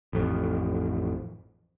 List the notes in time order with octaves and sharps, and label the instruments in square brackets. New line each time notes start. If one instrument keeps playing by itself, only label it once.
[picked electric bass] A1 F2